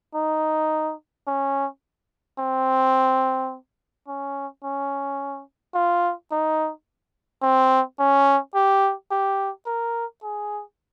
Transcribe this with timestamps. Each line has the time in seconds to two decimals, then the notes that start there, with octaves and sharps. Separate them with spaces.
0.15 D#4
1.27 C#4
2.39 C4
4.08 C#4
4.64 C#4
5.75 F4
6.31 D#4
7.42 C4
7.99 C#4
8.55 G4
9.11 G4
9.66 A#4
10.23 G#4